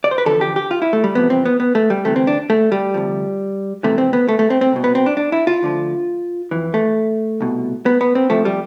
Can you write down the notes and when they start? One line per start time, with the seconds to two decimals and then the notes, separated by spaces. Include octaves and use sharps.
0.04 D5
0.11 C5
0.18 B4
0.26 E2 D3 F3 A4
0.41 G4
0.56 G4
0.71 F4
0.82 E4
0.93 A3
1.04 G3
1.15 E2 C3 F3 B3
1.30 C4
1.45 B3
1.60 B3
1.75 A3
1.90 G3
2.05 D2 C3 E3 A3
2.16 C4
2.27 D4
2.50 A3
2.72 G3
2.94 D2 C3 F3
3.83 F2 C3 E3 A3
3.98 C4
4.13 B3
4.29 A3
4.39 A3
4.50 C4
4.61 C4
4.72 C2 B2
4.84 B3
4.95 C4
5.06 D4
5.17 D4
5.32 E4
5.47 F4
5.63 D2 D3 F3
6.51 F2 E3
6.74 A3
7.41 C2 B2
7.86 B3
8.01 B3
8.15 C4
8.30 C2 C3 F3 A3
8.45 G3